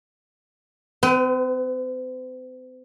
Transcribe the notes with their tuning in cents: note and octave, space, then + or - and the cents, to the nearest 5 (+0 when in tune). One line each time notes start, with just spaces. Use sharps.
C4 -40 B4 +25